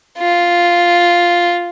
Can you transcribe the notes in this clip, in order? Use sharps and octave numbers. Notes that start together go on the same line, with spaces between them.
F4